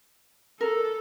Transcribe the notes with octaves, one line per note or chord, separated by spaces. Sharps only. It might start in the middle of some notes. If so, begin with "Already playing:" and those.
A4 A#4